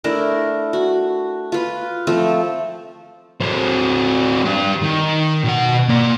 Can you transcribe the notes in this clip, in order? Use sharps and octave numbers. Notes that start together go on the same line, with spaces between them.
A3 D4 E4 A#4
F#4
F4 B4
F3 A3 C4
F#3 C4
D4 G4
D#3
B2 F#5
A#3 D5